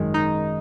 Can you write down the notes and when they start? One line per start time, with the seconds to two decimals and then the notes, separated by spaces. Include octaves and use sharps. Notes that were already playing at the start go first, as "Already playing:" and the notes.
Already playing: G#1 F#2 D#3 G#3
0.14 D#4